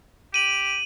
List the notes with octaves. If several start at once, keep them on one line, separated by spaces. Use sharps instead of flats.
G4 D#7 F#7